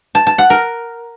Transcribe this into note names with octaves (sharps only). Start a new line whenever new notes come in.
A5
A5
F#5
A#4